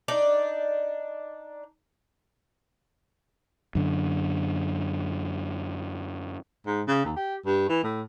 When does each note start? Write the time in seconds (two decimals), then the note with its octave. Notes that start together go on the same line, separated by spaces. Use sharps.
0.08 D4 D#4 D5
3.75 F#2 D3
6.66 G#2
6.88 C#3
7.05 D#2
7.16 G4
7.46 G2
7.69 E3
7.83 A2